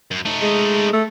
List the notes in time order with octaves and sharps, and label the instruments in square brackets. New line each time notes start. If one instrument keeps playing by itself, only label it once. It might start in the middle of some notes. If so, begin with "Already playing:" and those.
[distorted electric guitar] F#2
A3 D#4
[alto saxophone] G#3
A3